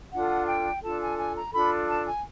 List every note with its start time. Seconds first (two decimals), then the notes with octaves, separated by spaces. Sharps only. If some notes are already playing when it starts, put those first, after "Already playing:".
0.12 D4 F4 A4 F#5
0.47 G5
0.82 D4 F4 A4 A5
1.01 G#5
1.17 G#5
1.35 A#5
1.52 D4 F4 A4 B5
1.88 A5
2.05 G#5